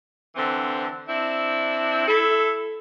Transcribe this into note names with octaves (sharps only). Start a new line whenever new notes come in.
D3 E3 C4
C4 D4 E4
E4 A4